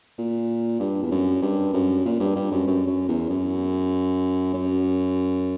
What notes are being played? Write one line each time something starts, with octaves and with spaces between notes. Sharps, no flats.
A#2
G2
E2
F#2
G2
F#2
A#2
G2
G2
F#2
F#2
F#2
E2
F#2
F#2